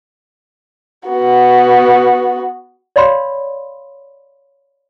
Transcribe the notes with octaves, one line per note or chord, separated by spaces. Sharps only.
B3 F#4
C#5 D5 F5 B5 C6